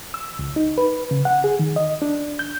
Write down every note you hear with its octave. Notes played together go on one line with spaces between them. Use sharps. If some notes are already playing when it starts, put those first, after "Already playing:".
E6
C#2
D#4
B4
C#3
F#5
G#4
D#3
D#5
D4
G6